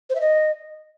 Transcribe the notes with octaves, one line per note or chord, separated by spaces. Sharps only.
C5
E5
D#5